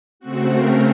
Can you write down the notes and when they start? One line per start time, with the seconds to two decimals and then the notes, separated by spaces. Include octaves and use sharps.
0.20 C#3 A3 C4 F#4
0.50 A#4